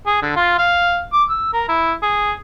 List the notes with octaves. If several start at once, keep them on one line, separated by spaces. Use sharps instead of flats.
G#4
D3
F4
F5
D6
E6
A#4
E4
G#4